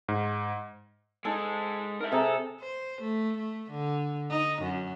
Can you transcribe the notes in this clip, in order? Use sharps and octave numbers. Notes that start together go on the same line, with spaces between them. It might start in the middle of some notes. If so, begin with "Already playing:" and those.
G#2
G#3 D#4 A4
A#4 E5
C3 G#4 A4 A#5
C5
A3
A3
D3
D#4
F#2